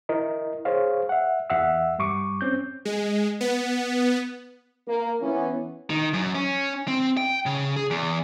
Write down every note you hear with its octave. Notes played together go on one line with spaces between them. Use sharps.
E4 A#4 D#5
G#4 C5 C#5 F5
E5 F#5
E2 E5 F#5 E6
G2 G3 C#6 D6
C4 C#4 G6
G#3
B3
A#3
E3 B3 C#4
D#3
F#2
C#4
C4
G5
C#3
G#4
E2